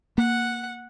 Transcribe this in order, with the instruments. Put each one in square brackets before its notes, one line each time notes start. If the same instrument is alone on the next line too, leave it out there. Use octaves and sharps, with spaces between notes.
[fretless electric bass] A#3 [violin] F#5